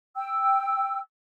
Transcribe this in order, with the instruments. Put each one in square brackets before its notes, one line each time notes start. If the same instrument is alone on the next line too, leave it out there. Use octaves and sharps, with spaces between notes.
[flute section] G5 E6